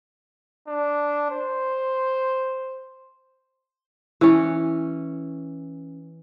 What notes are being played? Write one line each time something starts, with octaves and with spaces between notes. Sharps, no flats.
D4
C5
E3 C#4